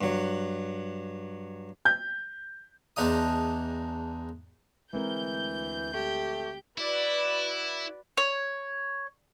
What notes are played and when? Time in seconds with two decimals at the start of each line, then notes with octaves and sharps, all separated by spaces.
0.01 G2 F#3
1.85 G6
2.96 E2 G#3 D4 D#4 D#6
4.93 D2 E3 G#3 C4 A#4 G6
5.94 A3 G4
6.78 E4 F#4 B4 D5
8.17 C#5